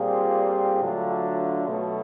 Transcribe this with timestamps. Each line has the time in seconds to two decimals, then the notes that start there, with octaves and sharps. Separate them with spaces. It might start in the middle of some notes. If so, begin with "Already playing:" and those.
Already playing: A#2 G3 C4 F4 G#4
0.80 D3 F#3 A3 D4 F4
1.67 B2 F#3 A3